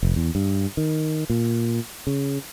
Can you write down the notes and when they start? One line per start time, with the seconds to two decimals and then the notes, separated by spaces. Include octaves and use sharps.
0.03 F1
0.16 E2
0.35 G2
0.77 D#3
1.30 A#2
2.07 C#3